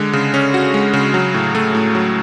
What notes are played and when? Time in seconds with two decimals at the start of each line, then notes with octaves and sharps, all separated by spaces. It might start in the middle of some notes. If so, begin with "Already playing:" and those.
Already playing: D3 G#3
0.13 C#3
0.34 C#4
0.54 F#4
0.74 G#3
0.93 C#3
1.14 F#3
1.34 A2
1.55 A3
1.75 A2
1.95 F#3